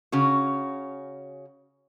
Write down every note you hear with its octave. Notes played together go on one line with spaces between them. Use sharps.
C#3 C#4 F#4